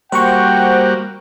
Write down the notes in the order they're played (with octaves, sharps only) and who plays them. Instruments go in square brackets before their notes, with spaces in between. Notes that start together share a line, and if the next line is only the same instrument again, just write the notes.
[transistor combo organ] G3 A#3 F#4 [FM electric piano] C5 C#6 [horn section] F#5 G5